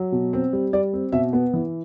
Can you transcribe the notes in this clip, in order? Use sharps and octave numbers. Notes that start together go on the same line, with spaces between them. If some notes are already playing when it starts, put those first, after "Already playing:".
Already playing: F#3
B2
C4
G3
G3 D5
C4
B2 E5
B3
E3